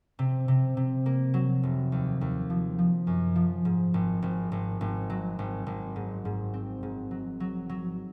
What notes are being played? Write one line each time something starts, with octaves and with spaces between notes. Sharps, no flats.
C3
C3
C3
A#3
F#3
F1
D#2
D#2
F3
F3
F#2
F3
G#2
G#1
G#1
G#1
G#1
F#3
G#1
G#1
G#2
G#2
C4
G#2
F#3
F#3
F#3